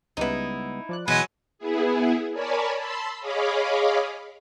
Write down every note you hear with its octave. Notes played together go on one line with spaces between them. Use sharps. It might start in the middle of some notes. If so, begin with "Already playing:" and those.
C#2 G3 B3 D#4 E4
F3 D5 F#6
B2 E3 F#3 G#3 B4 F#5
B3 E4 G#4
A#4 C#5 D5 G#5 A5 B5
A5 B5 C6 E6
G#4 C#5 D#5 F5 B5 D6